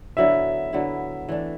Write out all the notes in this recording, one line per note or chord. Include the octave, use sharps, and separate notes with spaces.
D3 F#3 B3 E4 E5
D3 F#3 B3 E4
E3 A3 D4